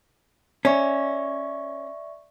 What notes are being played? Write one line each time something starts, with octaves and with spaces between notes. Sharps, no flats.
C#4 D5 E5 C#6